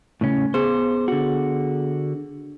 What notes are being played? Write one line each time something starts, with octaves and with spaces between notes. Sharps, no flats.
A2 C#3 C#4
B3 G#4 C5
D3 F#4